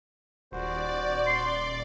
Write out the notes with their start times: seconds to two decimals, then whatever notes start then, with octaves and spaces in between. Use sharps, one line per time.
0.52 D#1 F#4 C5 D5
1.27 C6